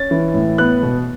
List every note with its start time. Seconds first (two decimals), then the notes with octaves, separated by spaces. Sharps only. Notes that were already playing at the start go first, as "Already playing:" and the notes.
Already playing: C#4 A6
0.11 E3
0.34 A2
0.58 B3 F#6
0.83 B2